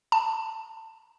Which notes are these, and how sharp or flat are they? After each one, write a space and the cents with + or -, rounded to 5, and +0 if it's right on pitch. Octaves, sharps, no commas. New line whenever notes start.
A5 +20